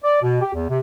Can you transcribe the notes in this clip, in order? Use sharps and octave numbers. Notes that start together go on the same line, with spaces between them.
D5
B2
G4
E2
C3